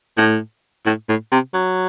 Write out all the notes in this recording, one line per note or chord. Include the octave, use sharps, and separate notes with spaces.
A2
A2
A2
C3
F#3